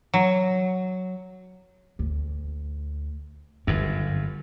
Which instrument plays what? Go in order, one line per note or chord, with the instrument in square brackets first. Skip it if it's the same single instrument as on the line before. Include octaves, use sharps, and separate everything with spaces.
[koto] F#3
[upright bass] D2
[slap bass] G1 F#2 [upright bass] D#3